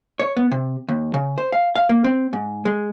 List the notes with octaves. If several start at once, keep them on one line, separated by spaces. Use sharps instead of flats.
C#5
B3
C3
D#2
C#3
C5
F5
F5
A#3
C4
G#2
G#3